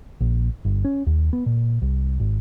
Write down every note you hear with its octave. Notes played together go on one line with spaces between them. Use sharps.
A#1
G1
C#4
D#2
B3
A#2
C2
G#1